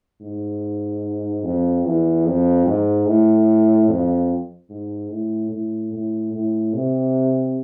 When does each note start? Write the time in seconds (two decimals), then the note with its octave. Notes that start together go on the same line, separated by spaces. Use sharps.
0.21 G#2
1.43 F2
1.85 E2
2.26 F2
2.67 G#2
3.06 A2
3.89 F2
4.70 G#2
5.11 A2
5.52 A2
5.93 A2
6.34 A2
6.74 C3